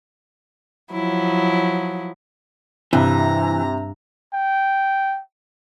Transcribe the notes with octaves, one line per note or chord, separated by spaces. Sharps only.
F3 F#3 E4
G2 C3 E3 A#5
G5